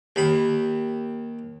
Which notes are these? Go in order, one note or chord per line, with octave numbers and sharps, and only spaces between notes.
D#2 B5